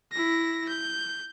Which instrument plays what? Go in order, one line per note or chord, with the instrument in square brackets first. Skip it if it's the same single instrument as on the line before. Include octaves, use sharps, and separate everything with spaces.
[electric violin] E4 A#6
G6